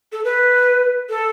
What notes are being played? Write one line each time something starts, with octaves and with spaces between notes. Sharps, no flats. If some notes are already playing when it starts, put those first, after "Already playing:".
A4
B4
A4